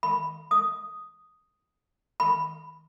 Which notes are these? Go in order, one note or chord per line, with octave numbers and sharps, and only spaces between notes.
B5
D#6
B5